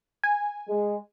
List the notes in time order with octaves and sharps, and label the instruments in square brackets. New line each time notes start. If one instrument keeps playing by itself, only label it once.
[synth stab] G#5
[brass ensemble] G#3